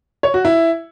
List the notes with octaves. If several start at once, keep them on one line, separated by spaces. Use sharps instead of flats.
C#5
F#4
E4